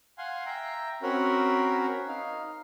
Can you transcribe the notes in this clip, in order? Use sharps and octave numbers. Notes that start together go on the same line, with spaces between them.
F5 F#5 G#5 C6
E5 G5 A#5
C4 C#4 F#4 A#4 B5
D#4 F5